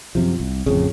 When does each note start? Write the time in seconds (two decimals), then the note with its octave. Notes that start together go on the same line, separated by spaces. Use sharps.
0.15 F#2 C3 F3
0.40 C2
0.66 A1 F2 C#3